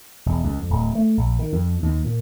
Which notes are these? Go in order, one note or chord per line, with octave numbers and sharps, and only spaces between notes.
E1
C#2
F2
D1
A3
A#1
D#3
F2
D#2
A#2